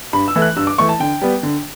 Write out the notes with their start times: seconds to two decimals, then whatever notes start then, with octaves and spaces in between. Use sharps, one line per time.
0.13 G2 B5
0.28 E6
0.36 E3 A3 E4
0.42 F#6
0.56 G2 E6
0.67 D6
0.78 E3 A3 E4 C#6
0.89 A5
1.00 D3 G5
1.21 G3 B3
1.43 D3